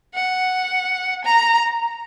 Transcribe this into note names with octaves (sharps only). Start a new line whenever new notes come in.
F#5
A#5